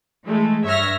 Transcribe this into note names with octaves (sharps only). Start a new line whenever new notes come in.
E3 G#3 A3
G2 C#5 E5 F6 A#6